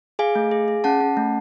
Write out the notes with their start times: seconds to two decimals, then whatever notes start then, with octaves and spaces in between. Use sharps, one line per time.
0.19 G#4 F5 G#5
0.35 A3
0.51 G#4
0.68 G#4
0.84 C#4 F#5 A5
1.01 C#4
1.17 A3